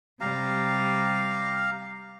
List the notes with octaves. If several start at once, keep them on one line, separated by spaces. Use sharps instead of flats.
C3 G3 G4 F5 A#5